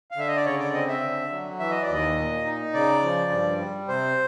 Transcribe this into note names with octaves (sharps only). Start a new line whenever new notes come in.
F5
D3 E5
D#5
D5
C#3 C#5
D5
C4 D#5
E5
D3
F#3
E3 E5
D#5
D5
D#2
D#5
A#2
D#4
C#3 D5
F3
G2
G3
C3 C5